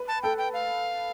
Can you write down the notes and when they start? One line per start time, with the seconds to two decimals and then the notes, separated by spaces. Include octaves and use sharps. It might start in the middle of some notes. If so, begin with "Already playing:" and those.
Already playing: B4
0.08 A5
0.23 A4 G5
0.38 G5
0.53 F5